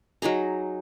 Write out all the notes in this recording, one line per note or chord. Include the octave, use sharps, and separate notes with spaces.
F#3 D#4 G#4 A#5